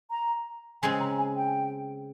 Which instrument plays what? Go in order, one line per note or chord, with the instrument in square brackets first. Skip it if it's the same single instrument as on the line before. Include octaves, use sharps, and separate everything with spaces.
[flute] A#5
[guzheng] C#3 G#3 C4 [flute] G#5
[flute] A#5
G#5
G5